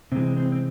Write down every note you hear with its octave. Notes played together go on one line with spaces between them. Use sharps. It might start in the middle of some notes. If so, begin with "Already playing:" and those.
C3 E3 G#3 C4
C4
C4